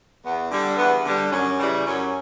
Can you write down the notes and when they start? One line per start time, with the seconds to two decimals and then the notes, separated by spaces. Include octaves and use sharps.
0.23 E2 B3
0.51 D3 G3
0.77 E2 B3
1.04 D3 G3
1.31 F#2 C#4
1.58 C#3 E3 G3
1.85 F#2 C#4